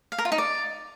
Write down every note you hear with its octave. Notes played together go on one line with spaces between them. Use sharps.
F5
A#4
F4
D#4
D5